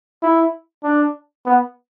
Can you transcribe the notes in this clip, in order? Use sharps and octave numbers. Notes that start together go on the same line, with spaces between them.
E4
D4
B3